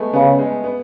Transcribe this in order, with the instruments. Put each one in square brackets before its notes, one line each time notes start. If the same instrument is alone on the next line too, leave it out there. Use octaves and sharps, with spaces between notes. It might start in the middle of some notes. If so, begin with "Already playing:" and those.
Already playing: [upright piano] G#3 A3 B3
[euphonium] C#3 [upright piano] B3
[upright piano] G#3
B3